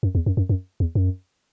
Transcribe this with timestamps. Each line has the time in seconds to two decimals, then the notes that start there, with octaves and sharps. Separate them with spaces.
0.03 F#2
0.15 E2
0.26 F#2
0.37 F#2
0.49 F#2
0.80 E2
0.95 F#2